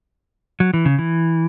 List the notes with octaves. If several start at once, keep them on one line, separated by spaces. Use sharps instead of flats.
F#3
E3
C#3
E3